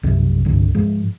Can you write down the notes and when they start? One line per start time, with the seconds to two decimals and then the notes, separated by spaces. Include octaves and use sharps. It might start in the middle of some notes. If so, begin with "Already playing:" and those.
0.03 B1 F#2 C3 F3
0.45 C2 G2 D3
0.75 G#2 F3 G#3